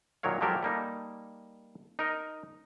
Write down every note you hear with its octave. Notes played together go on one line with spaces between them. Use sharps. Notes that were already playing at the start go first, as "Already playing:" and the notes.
A#2 D#3 F#3 A#4 C#5 F5
F3 F#3 G#3 G4 A4 A#4
G3 A#3 D#4 A4
D#4 A#4 D#5